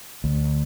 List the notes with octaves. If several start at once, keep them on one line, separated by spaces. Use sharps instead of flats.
D2